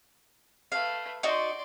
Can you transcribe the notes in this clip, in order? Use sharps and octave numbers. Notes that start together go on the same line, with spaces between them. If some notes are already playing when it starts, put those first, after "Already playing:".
A3 B4 F5
D#4 F#4 D5 C6